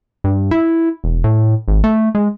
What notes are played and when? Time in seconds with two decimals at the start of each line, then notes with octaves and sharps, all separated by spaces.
0.24 G2
0.51 E4
1.04 E1
1.24 A2
1.68 G#1
1.84 A3
2.15 G#3